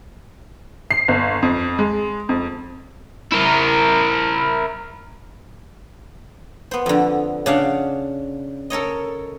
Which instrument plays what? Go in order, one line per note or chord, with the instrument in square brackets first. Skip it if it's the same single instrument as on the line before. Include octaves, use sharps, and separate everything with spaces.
[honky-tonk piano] C7
G1
F2
G#3
F2
[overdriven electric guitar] E4 A#4
[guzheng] B3 C5
F2 D3
C#3 D4 F5 F#5
A4 A#4 C#5 D#5